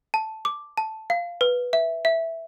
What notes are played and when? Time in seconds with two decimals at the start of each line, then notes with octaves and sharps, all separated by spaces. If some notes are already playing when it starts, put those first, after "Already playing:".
0.14 A5
0.45 D6
0.78 A5
1.10 F5
1.41 B4
1.73 E5
2.05 E5